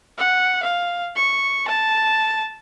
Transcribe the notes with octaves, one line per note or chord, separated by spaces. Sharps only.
F#5
F5
C#6
A5